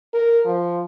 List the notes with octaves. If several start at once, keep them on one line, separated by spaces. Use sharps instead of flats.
A#4
F3